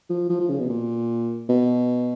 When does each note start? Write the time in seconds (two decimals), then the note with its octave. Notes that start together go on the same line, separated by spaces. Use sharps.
0.10 F3
0.29 F3
0.40 F3
0.49 C#3
0.59 B2
0.69 A#2
1.49 B2